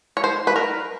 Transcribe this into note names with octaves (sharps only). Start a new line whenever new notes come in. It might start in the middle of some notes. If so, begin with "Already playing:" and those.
C#5
C5
B4
A#4